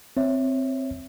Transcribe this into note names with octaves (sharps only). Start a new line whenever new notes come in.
C4 C#5 E5